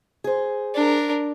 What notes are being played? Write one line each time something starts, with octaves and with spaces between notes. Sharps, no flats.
G#4 C5
D4 A#4